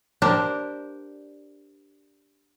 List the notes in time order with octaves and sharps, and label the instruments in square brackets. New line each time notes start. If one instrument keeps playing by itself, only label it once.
[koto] D4 G4 A#4 C5